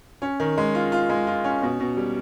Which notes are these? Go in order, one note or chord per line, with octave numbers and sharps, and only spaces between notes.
C#4
D#3
G#3
F4
F4
G#3
F4
C#4
B2
B2
G3